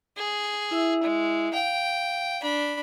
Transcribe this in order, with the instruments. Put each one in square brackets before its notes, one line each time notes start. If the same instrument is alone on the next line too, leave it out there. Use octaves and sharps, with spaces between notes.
[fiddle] G#4
[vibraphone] E4 E5 E6
[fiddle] G#3
[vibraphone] F5 [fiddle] G5
[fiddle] D4 B5